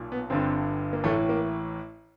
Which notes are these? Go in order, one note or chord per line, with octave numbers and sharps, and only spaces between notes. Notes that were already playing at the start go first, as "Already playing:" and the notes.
Already playing: B1 A#2
B3
G1 G2 D3 C4
A#3
A1 A2 E3 A3
A#3